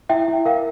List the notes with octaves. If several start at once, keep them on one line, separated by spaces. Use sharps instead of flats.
E4 E5 G5
E4
A#4 F5